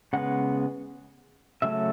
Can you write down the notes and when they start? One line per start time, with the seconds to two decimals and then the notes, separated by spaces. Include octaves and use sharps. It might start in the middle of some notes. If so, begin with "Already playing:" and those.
0.13 C#3 G#3 B3 F#5
1.62 C#3 F#3 A3 C#4 E5